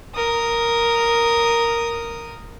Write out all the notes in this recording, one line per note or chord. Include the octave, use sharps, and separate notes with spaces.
A#4 D#6